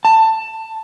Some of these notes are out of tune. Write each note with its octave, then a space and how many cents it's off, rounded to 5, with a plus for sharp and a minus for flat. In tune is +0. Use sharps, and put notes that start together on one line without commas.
A5 +15